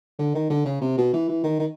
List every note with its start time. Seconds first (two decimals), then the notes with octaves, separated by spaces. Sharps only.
0.19 D3
0.35 D#3
0.50 D3
0.65 C#3
0.81 C3
0.98 B2
1.13 E3
1.29 E3
1.44 D#3
1.59 D#3